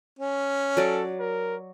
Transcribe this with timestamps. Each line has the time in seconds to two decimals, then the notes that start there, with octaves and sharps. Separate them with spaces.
0.19 C#4
0.77 F#3 A4 D5
1.20 A#4